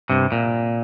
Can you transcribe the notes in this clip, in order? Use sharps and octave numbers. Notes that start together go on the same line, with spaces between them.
G2 C3
A#2